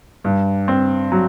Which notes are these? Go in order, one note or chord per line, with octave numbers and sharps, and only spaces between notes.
G2
C4
F#3